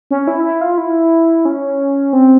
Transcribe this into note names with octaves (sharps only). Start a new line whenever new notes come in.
C#4
E4
E4
F4
E4
C#4
C4